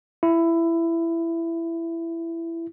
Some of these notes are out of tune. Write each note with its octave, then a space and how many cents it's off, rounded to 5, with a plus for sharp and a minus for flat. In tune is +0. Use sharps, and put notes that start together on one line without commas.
E4 +15